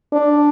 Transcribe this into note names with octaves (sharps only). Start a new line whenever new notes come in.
D4